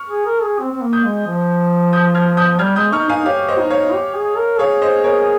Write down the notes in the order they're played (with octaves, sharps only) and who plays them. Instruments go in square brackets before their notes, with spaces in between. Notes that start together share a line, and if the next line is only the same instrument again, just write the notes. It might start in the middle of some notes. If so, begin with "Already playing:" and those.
Already playing: [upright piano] C#6 F6
[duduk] G#4
A#4
G#4
C4
C4
A#3
[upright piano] D#6 G6
[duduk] G#3
F3
[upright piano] D#6 G6
F6 G#6
D#6 G6
[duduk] G3 [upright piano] F6 G#6
[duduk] G#3 [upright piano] D#6 G6
[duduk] D#4 [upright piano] C#6 F6
[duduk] D#4 [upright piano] F5 G#5
[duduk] G4 [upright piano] C#5 F5
[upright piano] C5 D#5
[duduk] D#4
[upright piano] C#5 F5
[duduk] G4
G#4
A#4
[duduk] G#4 [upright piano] C#5 F5
[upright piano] C5 D#5
A#4 C#5